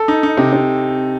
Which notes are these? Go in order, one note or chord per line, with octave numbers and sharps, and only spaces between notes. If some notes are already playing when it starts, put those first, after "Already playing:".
Already playing: A4
D#4
D#4
C3
C3